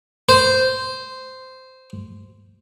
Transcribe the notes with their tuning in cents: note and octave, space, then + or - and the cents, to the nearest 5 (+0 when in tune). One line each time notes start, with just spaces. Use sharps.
C5 -10